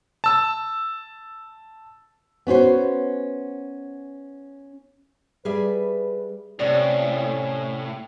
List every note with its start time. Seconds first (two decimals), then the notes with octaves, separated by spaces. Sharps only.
0.24 A5 E6
2.47 B3 C#4 F#4 C5
5.45 G3 G#4 B4 E5
6.59 A2 C3 C#4 D5